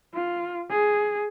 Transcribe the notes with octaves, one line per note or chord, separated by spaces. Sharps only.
F4
G#4